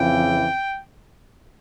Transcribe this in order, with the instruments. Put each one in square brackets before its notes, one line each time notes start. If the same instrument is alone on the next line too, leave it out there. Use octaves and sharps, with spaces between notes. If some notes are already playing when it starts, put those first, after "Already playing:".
Already playing: [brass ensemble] F2 C#3 E3 G5